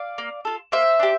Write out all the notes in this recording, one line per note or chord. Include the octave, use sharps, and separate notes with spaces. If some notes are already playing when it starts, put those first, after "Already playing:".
Already playing: D5 F5
A#3
F4 A4
A#3 C5 E5
D4 G4